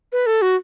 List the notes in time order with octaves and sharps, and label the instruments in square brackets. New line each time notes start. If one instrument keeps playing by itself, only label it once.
[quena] B4
A4
F#4